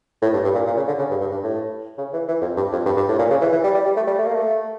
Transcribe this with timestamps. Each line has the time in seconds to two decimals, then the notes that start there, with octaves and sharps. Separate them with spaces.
0.22 A2
0.33 G2
0.44 G2
0.54 A#2
0.66 A#2
0.77 C#3
0.87 D3
0.98 C#3
1.10 G2
1.21 G2
1.31 G2
1.43 A2
1.98 C#3
2.13 E3
2.28 E3
2.41 F2
2.57 G2
2.72 F2
2.86 G2
2.97 G2
3.09 A2
3.18 A#2
3.30 C#3
3.41 E3
3.52 E3
3.64 G3
3.74 G3
3.85 G3
3.96 A3
4.07 G3
4.18 A3
4.27 A#3
4.35 A3